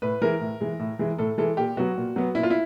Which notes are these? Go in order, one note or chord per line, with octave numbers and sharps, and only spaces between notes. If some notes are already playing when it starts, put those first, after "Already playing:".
A2 B4
E3 G#3 A#4
A2
E3 G#3
A2
E3 G#3
A2 A4
E3 G#3 A4
A#2 G4
F#3 B3 F#4
A#2
F#3 B3
A#2 E4
F4
E4